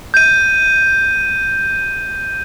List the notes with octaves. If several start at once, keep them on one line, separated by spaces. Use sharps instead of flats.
G6 D#7